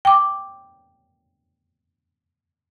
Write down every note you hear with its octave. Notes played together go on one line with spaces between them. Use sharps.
G5 D6